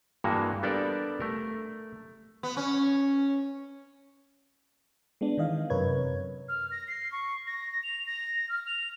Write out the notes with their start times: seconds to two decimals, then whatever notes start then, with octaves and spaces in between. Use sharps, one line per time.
0.24 G2 E3 G#3 A#3 F#4
0.63 G3 B3 D4 A4 A#4 D5
1.20 A3 A#4
2.43 B3
2.57 C#4
5.21 G#3 B3 D4
5.38 D#3 E3 D#5 F5
5.70 F#2 C3 A#4 B4 C#5 G#6
6.49 F6
6.71 A#6
6.88 C7
7.12 C#6
7.47 A#6
7.83 F7
8.07 A#6
8.49 F6
8.66 F7